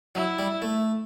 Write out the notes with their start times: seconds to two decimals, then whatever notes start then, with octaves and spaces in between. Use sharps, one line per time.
0.15 F#3 E4
0.39 G3
0.62 A3